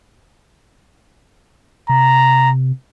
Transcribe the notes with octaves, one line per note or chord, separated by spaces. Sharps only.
C3 A#5